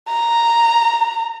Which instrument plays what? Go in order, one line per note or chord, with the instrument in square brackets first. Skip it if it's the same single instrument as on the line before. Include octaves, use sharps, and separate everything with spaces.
[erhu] A#5